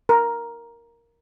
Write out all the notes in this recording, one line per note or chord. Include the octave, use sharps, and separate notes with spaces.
A#4